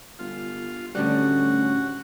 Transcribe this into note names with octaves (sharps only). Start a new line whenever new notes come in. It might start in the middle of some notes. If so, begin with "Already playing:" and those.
G1 F4
D2 A2 D3 G3 C#4 F#4